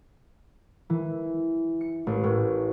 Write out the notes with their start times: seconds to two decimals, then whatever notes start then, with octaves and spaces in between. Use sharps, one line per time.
0.90 E3
1.81 C#7
2.07 A1
2.24 A2